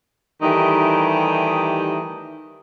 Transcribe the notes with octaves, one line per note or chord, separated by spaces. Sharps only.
D#3 E3 G3 A3 D#4 G4